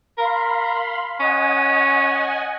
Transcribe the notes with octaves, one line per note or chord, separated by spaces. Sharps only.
A#4 F5 B5 C6
C#4 D#5 F#5 G#5